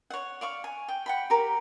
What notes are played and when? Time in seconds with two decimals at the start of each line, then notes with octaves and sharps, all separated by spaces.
0.10 C#5 F#5
0.41 D5 F5 C#6
0.64 G#5
0.88 G5
1.06 F#5 G5 B5
1.30 G4 A#4